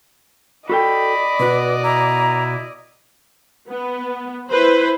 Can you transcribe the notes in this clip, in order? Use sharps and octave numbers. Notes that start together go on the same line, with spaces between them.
F#4 A4 D5 D#5 G5 B5
B2 F#4 B4
E4 A#5
B3
E4 B4 C5